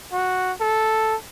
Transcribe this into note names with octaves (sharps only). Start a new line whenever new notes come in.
F#4
A4